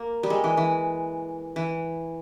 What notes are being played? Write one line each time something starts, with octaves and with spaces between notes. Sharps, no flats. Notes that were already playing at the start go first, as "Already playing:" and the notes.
Already playing: A#3
G3
G#3
E3
E3
E3